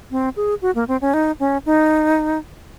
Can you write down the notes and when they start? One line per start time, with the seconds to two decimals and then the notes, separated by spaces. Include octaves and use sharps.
0.11 C4
0.36 G#4
0.62 F#4
0.75 A#3
0.88 C4
1.01 C#4
1.14 D#4
1.40 C#4
1.66 D#4